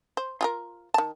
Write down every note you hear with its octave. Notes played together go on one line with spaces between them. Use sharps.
C5
F4 G#4 A#4
D#3 A5